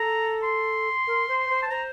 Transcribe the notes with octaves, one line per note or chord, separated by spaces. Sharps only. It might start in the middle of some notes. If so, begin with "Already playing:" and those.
Already playing: A4 A#5
C6
A#4
C5
C5
A5
C5 A#5